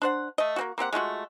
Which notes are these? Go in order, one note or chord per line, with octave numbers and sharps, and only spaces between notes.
D4 C5 F#5
A3 D#5
A#3 C4 F#4
A#3 C4 G4 F#5
G#3 A3 F4 F#4